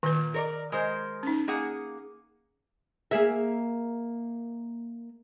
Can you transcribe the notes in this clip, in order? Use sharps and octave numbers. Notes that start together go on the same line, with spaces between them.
A#2 D#3 B4
A#4 C#5 D5
G#3 A#4 C5
C#4 D#4
A#3 G#4 F#5
A#3 G#4 E5